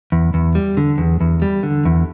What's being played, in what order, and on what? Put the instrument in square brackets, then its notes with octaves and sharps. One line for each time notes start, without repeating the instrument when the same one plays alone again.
[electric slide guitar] E2
E2
G3
D3
E2
E2
G3
D3
E2